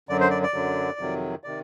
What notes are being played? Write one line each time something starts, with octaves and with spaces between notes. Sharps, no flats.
F#2 D3 F#3 D5
C5
D5
D5
F#2 D3 F#3
F2 C3 D#3 F#3
C3 D#3 D5